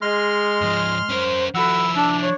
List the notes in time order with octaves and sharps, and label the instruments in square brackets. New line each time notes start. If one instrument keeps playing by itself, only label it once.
[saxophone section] G#3 [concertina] C6 F6
[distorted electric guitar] G#2 F3
[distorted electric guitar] C#4 A#4 [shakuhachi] C5
[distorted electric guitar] F3 E4 [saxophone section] F#4 A4 F#5 [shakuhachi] B5 [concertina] E6
[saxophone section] D4 [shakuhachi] A5
[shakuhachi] C#5